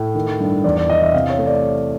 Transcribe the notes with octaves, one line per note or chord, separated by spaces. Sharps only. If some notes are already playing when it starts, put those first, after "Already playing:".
Already playing: A2
D#3
G2
E2 D5
D5
E3 D#5
E5
C3 F5
C#5
A3
D5